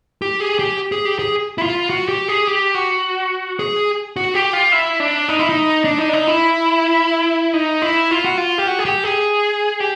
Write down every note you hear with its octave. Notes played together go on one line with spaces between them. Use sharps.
G4
G#4
G4
G#4
G4
G#4
E4
F4
F#4
G4
G#4
G4
F#4
G#4
F#4
G4
F4
E4
D4
D#4
E4
D#4
D4
D#4
D4
D#4
E4
D#4
E4
F4
F#4
F4
G4
F#4
G#4
G4
G#4
G4